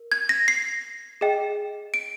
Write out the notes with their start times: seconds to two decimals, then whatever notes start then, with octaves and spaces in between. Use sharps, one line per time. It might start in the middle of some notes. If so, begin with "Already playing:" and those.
Already playing: A#4
0.12 G#6
0.29 A#6
0.48 C7
1.21 G#4 D#5 G5
1.94 D7